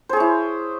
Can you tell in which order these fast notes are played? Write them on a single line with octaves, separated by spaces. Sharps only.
C5 G#4 C#5 E4